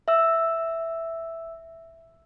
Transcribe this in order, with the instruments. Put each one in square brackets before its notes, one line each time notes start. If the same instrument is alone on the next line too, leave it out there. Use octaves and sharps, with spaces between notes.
[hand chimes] E5 E6